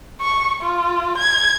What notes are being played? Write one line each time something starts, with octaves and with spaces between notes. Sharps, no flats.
C#6
F4
G#6